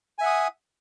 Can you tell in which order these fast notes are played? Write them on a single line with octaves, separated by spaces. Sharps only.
G#5 E5 F#5 D#6